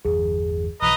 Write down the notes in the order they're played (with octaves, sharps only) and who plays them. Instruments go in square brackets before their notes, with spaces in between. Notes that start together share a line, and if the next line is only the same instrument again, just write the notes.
[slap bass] G1 E2 G3 [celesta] G#4
[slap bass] B1 E3 F3 [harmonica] B4 D#5 A#5